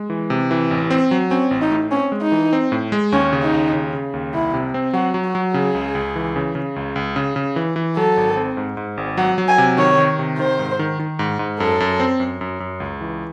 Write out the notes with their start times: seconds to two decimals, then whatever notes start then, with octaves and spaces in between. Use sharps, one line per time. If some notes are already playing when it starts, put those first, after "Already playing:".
Already playing: G#3
0.10 E3
0.30 C3
0.51 E3
0.71 A1
0.90 C4
1.11 F#3
1.31 C4 C#4
1.51 A1
1.62 D#4
1.71 A2
1.91 C4 C#4
2.12 G#3
2.22 D#4
2.32 E3
2.53 C4
2.72 A2
2.92 G#3
3.12 D#2 C#4
3.33 C#3
3.43 D#4
3.53 D#2
3.73 C#3
3.93 C#3
4.14 D#2
4.33 C2 E4
4.54 C3
4.74 C4
4.93 F#3 F#4
5.14 F#3
5.24 F#4
5.35 F#3
5.54 C#3 G#4
5.74 C#2
5.95 C#2
6.16 E3
6.36 C#3
6.55 C#3
6.76 C#2
6.96 C#2
7.16 C#3
7.36 C#3
7.56 E3
7.76 E3
7.96 F#3 A4
8.17 G#1
8.36 C4
8.57 G#2
8.77 G#2
8.97 G#1
9.18 F#3 F#5
9.38 F#3
9.48 G#5
9.58 C3
9.78 D#3 C#5
9.98 D#3
10.19 C3
10.38 D#3 C5
10.59 G#2
10.79 D#3
10.99 D#3
11.19 G#2
11.39 G#2
11.60 F#2 A4
11.80 F#2
12.00 C4
12.20 F#2
12.41 F#2
12.60 F#2
12.80 C#2
13.01 E3